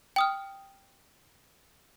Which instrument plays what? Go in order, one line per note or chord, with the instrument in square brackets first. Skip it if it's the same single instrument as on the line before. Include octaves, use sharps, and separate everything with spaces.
[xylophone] G5 D#6 F6